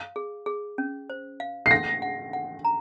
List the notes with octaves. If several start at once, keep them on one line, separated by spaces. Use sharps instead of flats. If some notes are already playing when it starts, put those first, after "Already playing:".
Already playing: F5
G#4
G#4
C#4
C5
F5
C7
F#5 A#6
F#5
F#5
A#5